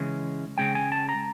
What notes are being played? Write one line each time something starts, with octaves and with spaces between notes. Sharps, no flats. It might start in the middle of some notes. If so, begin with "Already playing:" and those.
Already playing: C#3 E3 G#3 C#4
C#3 E3 G#3 C#4 G5
G#5
A5
A#5